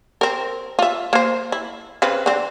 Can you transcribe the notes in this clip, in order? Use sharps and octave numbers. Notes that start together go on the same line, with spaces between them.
C4 A#4
F4 E5
A#3 C5
E4
C#3 C4 B4
D3 C4